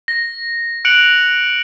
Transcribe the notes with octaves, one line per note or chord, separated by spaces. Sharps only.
A#6
F#6 C#7 D7 F7 F#7